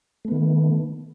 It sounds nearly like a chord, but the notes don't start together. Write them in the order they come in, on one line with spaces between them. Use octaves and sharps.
A3 B3 D#3